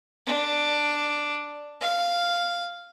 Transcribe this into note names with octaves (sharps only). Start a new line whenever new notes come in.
D4
F5